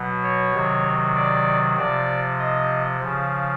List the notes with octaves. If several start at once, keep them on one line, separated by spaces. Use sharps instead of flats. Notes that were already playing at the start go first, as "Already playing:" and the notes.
Already playing: B2 F#3
C#5
C3 D#3 F#3
D5
C3 F3 D5
D#5
C#3 F3